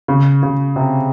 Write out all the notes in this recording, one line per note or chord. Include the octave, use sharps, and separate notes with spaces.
C#3
C#3
C3